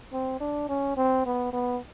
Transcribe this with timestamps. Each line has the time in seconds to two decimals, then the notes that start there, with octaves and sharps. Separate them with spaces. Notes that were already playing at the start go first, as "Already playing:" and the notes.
0.13 C4
0.40 D4
0.69 C#4
0.97 C4
1.26 B3
1.53 B3